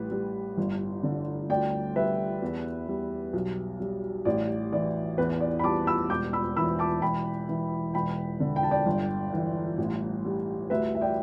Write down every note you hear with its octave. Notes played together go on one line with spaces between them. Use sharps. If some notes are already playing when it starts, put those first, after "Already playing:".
Already playing: A1 G3 B4
G3
G1
D3
D2 D5 G5
G3 B4 E5
E2
G3
B1
G3
A1 D5
E3 D5
E2 B4
D5
B5
G3 A5 D6
B5 E6
E1 D6 G6
B5 E6
E3 B5 E6
A5 D6
E1 G5 B5
E3
E1 G5 B5
D3
G5
A5
D5 G5
G1
E3
A1
G3
D2 B4 E5
E5
D5 G5